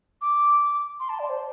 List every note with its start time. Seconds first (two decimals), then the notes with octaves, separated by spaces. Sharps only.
0.22 D6
1.00 C6
1.09 A5
1.19 D5
1.30 C5